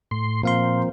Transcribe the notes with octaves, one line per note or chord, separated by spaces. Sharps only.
A2 C6
A#2 F3 A#3 C4 F5 C6